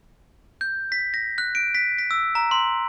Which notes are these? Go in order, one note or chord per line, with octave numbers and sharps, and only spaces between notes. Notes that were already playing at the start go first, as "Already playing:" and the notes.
G6
B6
A#6
F#6
D7
B6
B6
E6
A#5
C6